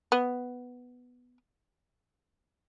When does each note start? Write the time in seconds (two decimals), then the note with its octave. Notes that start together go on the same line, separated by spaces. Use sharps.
0.12 B3